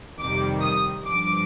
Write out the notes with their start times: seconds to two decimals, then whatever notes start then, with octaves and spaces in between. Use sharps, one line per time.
0.19 F2 C3 D#3 G3 D6
0.63 D#6
1.05 G2 F3 D6